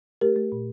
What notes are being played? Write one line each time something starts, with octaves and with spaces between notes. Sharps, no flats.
A3 G4 A#4
A3
A#2